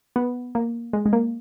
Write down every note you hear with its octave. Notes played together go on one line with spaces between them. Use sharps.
B3
A#3
G#3
G#3
A#3